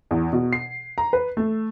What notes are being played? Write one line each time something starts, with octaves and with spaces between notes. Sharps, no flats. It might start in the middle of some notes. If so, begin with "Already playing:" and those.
E2
B2
C7
A#5
B4
A3